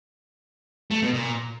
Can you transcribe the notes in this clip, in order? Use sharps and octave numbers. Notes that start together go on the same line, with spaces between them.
A3
B2
A#2